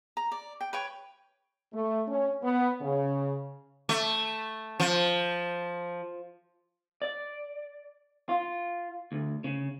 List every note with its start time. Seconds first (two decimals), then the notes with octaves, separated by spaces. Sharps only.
0.17 A#5
0.32 D5
0.61 G5
0.73 B4 C#5 G5 C#6
1.73 A3
2.08 C#4
2.42 B3
2.81 C#3
3.89 A3
4.80 F3
7.02 D5
8.29 F4
9.12 D2
9.44 C#3